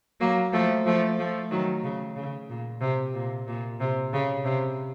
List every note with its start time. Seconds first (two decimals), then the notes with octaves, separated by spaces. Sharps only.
0.20 F#3 A#3
0.53 F3 A3
0.86 F3 A3
1.19 F3 A3
1.51 D#3 F#3
1.84 C#3
2.16 C#3
2.50 A#2
2.81 C3
3.14 A#2
3.48 A#2
3.80 C3
4.13 C#3
4.45 C3